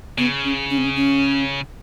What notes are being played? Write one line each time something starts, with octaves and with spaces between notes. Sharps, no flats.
C#3 B3
C#4
C#4
C4
C#4
C#4